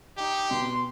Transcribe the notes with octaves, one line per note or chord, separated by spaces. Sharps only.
D#4 G4
B2 C6